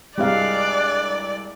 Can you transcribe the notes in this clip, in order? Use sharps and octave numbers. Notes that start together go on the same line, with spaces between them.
C2 G2 G3 G#3 D5 F5 F#6